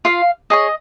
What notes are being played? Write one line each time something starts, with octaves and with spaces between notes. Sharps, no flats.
F4 F5
G#4 C#5 D#5